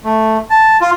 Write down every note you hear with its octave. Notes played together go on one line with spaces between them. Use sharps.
A3
A5
F4